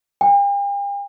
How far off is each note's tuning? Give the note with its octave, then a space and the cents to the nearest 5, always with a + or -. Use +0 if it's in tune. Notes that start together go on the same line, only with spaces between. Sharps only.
G5 +45